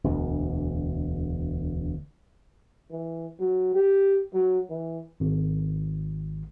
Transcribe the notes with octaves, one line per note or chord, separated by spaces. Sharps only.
E1 D2
E3
F#3
G4
F#3
E3
G#1